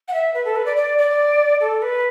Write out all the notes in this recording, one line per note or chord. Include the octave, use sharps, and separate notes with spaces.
F#5
E5
B4
A4
B4
D5
D5
D5
A4
B4